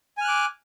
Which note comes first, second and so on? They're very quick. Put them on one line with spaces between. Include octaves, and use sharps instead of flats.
G#5 F6 F#6 D6